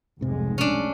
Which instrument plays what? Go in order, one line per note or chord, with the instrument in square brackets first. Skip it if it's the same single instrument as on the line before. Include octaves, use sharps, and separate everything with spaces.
[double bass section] F1 B1 G#3 [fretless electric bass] G#2 C3
[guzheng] C#4 D4